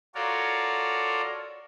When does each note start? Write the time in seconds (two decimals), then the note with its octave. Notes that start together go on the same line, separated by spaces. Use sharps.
0.15 F4 F#4 A4 A#4 C#5 D5